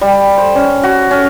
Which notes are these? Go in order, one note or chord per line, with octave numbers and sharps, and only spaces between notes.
G3
C5
C#4
F#4
C#4